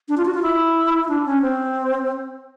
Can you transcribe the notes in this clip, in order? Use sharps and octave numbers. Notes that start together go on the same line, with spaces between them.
D4
F4
F#4
F4
E4
D4
C#4
C4